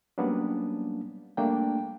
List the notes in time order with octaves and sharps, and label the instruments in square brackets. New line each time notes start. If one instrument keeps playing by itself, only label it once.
[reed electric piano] F#3 G3 A#3 B3 C#4 D4
G3 A3 A#3 D4 G5